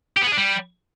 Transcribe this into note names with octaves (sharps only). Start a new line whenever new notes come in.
G4
B3
G#4
D4
G3